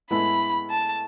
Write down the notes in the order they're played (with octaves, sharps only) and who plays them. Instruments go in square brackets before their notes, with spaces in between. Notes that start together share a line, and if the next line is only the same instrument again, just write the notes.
[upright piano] A2 G#3 B3 E4 A4 [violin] B5
[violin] A5